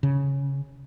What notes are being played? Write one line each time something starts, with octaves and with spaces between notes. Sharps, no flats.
C#3